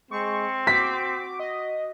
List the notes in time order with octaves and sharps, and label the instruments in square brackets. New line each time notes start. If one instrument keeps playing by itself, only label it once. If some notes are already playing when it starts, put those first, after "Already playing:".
[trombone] G#3 [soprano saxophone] C4 [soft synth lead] C#6
[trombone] F#4 [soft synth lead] D6 [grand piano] B6
[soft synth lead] D#5